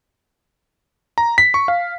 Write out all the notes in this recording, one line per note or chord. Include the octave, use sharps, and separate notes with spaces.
A#5
B6
C#6
F5